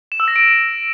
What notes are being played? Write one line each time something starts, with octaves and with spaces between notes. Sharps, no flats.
E7
E6
A#6
D7